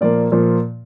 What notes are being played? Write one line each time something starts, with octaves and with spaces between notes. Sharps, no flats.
A#2 F3 A#3 D5
A#2 F3 A#3